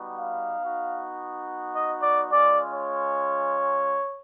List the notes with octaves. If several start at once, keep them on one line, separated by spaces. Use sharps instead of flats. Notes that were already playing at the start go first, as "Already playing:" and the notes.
Already playing: G3 B3 D#4 F#4
F5
B3 D#4 F#4
D#5
D5
G#3 C#4 F4 D5
C#5